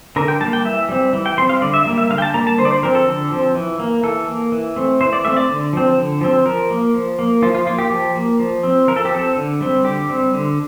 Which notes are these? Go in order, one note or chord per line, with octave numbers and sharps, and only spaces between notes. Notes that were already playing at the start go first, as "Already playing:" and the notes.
D3 A#4
G5
G3 A#3 A5
G5
E3 E5
G3 C4
E3
G5
G3 C4 C6
F5
D3 D5
E5
G3 A#3
E5
D3 F5
G5
A5
G3 A#3 A#5
A5
D3 C5
D5
C5
F3 C4 A#4
A4
D3
F3 C4
E3
A#3
E3 A4
A#3
E3
A3 C4
E3 C5
D5
A3 C4 E5
D5
D3
F3 C4
D3
F3 C4
F3 A#4
A#3
F3
A#3
F3 F4
F4
A#3 F4
G4
F3
A#3
F3
C4
F3 A#4
A4
G4
C4 A4
D3
G3 C4
D3 G4
G3 C4
D3